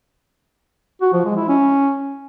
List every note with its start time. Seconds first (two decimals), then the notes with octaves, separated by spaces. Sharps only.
1.01 F#4
1.13 F3
1.25 G#3
1.37 E4
1.48 C#4